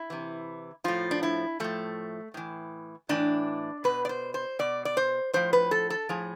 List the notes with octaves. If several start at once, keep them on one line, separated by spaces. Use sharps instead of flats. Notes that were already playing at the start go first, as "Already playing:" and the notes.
Already playing: E4
C3 E3
A2 F3 F4
D4
E4
A2 F3 A3
A2 E3
A2 E3 D4
B2 B4
D5
C5
C5
B2 D5
D5
C5
A2 F3 C5
B4
A4
A4
A2 F3 G#4